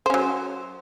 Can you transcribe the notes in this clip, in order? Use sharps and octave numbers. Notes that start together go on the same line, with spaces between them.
F#3 C#4 C5